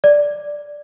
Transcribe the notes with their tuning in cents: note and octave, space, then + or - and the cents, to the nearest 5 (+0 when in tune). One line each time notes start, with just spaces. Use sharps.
D5 +0